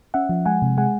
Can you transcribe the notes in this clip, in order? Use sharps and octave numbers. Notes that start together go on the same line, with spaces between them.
C#4 E5 F#5
F3
G#3 F#5 G#5
C3
G#3 F#5 G#5